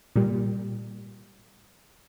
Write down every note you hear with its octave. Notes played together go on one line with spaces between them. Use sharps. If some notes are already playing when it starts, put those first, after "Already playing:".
A#2 G3